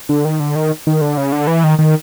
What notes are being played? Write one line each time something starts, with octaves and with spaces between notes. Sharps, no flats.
D3
D#3
D3
D#3
D#3
D3
C#3
D3
E3
D#3
D#3